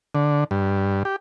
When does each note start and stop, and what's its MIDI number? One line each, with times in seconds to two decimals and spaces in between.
0.15 0.44 50
0.51 1.03 43
1.05 1.16 67